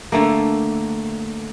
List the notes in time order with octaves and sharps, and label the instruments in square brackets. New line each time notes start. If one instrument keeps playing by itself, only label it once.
[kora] D3 A3 A#3